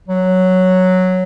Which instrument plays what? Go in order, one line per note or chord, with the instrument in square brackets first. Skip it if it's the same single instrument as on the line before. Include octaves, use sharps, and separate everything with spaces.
[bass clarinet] F#3